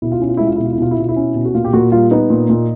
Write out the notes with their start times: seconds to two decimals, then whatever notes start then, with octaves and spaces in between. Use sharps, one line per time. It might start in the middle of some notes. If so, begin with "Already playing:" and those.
0.02 B2 E4
0.12 F4
0.20 C#4 E4
0.29 F4
0.37 G#3 E4
0.47 F4
0.56 B2 E4
0.65 F4
0.73 E4
0.78 B2 F4
0.91 E4
0.98 B2 F4
1.09 E4
1.16 C#4
1.35 B2
1.45 F#4
1.55 A#2 F4
1.65 G4
1.73 A#2 F#4
1.92 G3 F4
2.11 B3 D#4
2.30 A#2
2.50 A#2